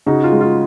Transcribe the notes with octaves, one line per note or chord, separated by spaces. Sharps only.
C#3 D#4 F#4
F4
G#3
F4